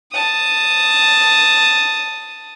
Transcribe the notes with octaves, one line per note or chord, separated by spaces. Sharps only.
A5 D#6